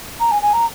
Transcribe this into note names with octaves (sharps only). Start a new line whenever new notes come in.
A#5
G#5
G#5
A#5